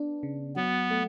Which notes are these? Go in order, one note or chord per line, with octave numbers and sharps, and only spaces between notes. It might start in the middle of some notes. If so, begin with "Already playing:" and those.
Already playing: B3 D4
C#3
F#3 B3
A3